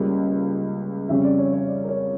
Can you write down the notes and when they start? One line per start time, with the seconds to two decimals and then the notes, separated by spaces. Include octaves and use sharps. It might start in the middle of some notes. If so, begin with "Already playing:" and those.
Already playing: C#2 C#3 G3 A#3 C#4
1.09 F2 C#3 G3 C#4 E5
1.24 D5
1.38 C#5
1.53 C#5
1.68 D5
1.84 A#4
1.89 C#5